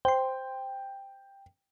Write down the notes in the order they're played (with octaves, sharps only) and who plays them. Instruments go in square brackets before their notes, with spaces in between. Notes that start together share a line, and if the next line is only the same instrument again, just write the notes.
[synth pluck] C5 C6 [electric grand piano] G5